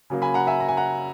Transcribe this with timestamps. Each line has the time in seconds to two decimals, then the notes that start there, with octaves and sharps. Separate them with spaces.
0.10 C#3 F#3 A#3
0.22 G#5 B5
0.34 F#5 A#5
0.47 E5 G#5
0.60 A#5
0.69 G#5
0.77 F#5 A#5